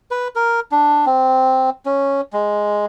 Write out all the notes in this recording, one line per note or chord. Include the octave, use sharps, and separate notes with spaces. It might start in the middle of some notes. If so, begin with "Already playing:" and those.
B4
A#4
D4
C4
C#4
G#3